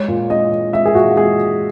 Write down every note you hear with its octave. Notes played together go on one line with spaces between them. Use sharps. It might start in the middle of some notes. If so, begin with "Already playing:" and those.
Already playing: G#3 C#5
A#2
G#3 D#5
A#2
G#3 E5
G#4
A#2 F#4
G#3 G#4